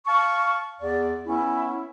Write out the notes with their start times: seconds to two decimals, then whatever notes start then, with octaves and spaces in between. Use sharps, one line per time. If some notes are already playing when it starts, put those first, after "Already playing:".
0.07 F5 A5 C#6
0.81 E2 D5
1.26 B3 C#4 E4